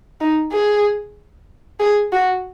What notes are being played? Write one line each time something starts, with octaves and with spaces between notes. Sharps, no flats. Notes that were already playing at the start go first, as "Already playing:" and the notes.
D#4
G#4
G#4
F#4